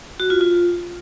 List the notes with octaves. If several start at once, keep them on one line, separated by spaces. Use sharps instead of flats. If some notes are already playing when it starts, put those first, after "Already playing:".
F#4
F4
F4